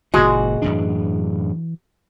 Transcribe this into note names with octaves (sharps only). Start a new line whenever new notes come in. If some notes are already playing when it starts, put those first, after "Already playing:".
G1 A#2 C#3 E3 G#3 F#4
F#2 A2 E3 D4